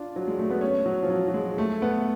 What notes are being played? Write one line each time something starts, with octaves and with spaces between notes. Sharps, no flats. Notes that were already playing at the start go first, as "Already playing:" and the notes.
Already playing: D4 F4
F#3
G#3
A3
B3
C#4
F#3
F3
F#3
F#3
G#3
A3
B3